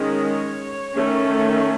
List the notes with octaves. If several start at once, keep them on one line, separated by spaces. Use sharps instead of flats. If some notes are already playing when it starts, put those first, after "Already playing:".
Already playing: D#3 G#3 C#4
C#5
D#3 A3 C#4